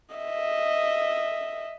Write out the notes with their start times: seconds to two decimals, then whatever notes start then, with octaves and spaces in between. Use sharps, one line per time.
0.16 D#5 E5